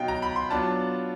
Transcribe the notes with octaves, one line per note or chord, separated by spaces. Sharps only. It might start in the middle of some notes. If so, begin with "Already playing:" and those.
Already playing: B2 F#3 B3 D#4 F5 G5
A#5
B5
C6
F#3 B3 D4 F4 A5